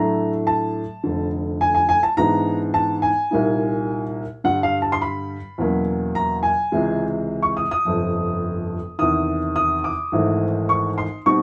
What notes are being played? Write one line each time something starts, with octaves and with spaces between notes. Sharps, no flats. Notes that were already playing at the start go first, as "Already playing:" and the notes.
Already playing: A2 F#3 A3 D4 A#5
A5
F1 F2 D3
G#5
G#5
G#5
A5
G#2 E3 G#3 B3 D4 A#5
A5
G#5
C2 A#2 G3 A#3 D#4
G2 D3 G3 F#5
F5
A5
C6
B5
E2 B2 F#3 A#3 C#4
A#5
G#5
C#2 C3 E3 G#3
C#6
D#6
D#6
G1 F2 C3 F3
E2 C3 D#3 D#6
D#6
D6
G#1 G#2 E3 A3
C#6
C6
B2 G3 C4 D#4 C#6